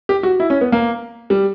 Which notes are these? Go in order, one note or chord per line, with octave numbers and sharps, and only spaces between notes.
G4
F#4
E4
C#4
B3
A#3
G3